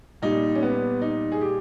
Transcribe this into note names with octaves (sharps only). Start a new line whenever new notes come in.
A#2 G3 D#4
C#4
B3
D#4
G#4
G4